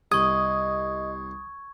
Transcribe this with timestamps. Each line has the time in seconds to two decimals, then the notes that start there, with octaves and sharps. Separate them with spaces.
0.12 C2 D#5 C#6 D#6 G#6